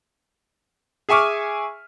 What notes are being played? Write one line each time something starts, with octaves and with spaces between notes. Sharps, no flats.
G#4 E5 G#5 C#6 D6 F6